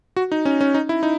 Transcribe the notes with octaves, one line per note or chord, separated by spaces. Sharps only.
F#4
D#4
C#4
C#4
D#4
E4
D#4